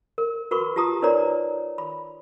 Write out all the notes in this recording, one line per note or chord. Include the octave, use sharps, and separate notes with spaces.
A#4
F#4 A#4 B4 B5 C#6
F4 G4 A5 A#5 D#6
D#4 A#4 B4 C#5 D5 A#5
B5